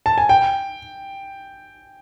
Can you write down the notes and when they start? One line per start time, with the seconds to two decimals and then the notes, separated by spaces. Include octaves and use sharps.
0.06 A5
0.18 G#5
0.29 G5